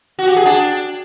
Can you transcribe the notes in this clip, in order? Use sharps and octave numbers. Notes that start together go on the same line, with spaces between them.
F#4
G4
G#4
D4